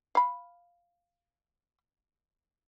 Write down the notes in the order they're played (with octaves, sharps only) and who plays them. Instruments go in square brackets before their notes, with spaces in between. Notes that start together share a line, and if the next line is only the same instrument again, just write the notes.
[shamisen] F5 B5